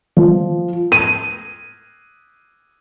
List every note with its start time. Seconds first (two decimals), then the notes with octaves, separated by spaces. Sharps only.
0.17 F3
0.92 D#7